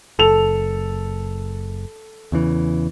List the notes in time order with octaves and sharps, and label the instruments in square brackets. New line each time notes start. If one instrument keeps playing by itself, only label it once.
[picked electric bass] F#1 [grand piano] A4 F7
[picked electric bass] E2 C#3 E3